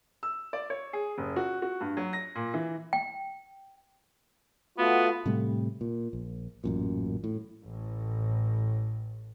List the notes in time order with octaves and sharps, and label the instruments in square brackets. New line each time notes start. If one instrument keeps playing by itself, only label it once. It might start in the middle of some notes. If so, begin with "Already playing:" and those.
[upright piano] E6
D5
C#5
G#4
F#1
F#4
F#4
G2
F#3
A#6
A#2
E3
[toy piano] G5
[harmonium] A3 F4 F#4 [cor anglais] B3
[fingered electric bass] A2 C3 G3 A3
A#2
A#1
A1 F#2 A#2
A2
[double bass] A1 A2